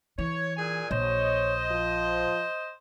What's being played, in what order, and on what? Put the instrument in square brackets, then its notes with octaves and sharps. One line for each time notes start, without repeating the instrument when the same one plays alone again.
[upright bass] E3 [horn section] C#5
[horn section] A#2 G#4 G#5
[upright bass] A#1 [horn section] C5 D#5 [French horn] C#5
[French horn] F3